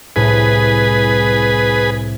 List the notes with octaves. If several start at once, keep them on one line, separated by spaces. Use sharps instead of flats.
C2 A2 G#4 B4